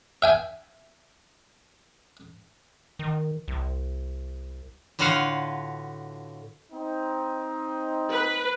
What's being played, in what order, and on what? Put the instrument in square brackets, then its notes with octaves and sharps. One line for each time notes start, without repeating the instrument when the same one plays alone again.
[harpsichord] E5 G5 G#5
[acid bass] D#3
C2
[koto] A2 D3 F4 F#4 B4 F5
[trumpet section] C4 D#4
[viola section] B4